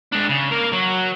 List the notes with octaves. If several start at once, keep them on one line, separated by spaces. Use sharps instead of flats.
G#3 D4
C#3
A#3 A#4
F#3